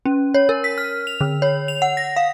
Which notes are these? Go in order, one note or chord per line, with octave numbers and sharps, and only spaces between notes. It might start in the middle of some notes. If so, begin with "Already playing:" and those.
C#4
C#5
A#4
B6
F6
F7
D3
C#5
F7
F#5
A#6
F5